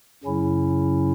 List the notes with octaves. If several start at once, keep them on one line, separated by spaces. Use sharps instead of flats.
F#2 C#3 F#3 C#4 E4